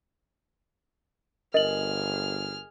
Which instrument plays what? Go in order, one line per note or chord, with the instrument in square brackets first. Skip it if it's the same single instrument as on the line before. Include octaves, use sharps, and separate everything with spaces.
[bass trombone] G1 [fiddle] G#4 F6 [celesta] A#4 F#7 [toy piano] D#5